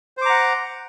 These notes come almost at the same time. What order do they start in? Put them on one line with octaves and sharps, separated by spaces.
C5 D6 A#5 F#5